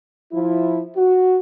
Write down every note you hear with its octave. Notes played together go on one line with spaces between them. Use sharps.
F3 E4
F#4